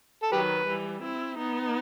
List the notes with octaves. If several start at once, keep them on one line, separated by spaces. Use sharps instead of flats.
A4
D#3 F#3 G4 B4
E3 G3
C4 E4
B3 D#4